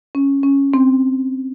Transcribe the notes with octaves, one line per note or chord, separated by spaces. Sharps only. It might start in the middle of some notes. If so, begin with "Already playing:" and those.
C#4
C#4
C4